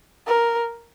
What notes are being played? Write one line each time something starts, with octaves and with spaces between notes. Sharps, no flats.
A#4